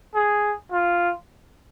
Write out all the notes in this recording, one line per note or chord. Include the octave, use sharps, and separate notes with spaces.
G#4
F4